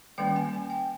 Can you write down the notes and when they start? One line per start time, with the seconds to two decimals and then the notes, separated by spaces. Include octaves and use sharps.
0.18 D#3 G3 A#3 C#4 G5
0.36 G#5
0.53 G#5
0.70 G5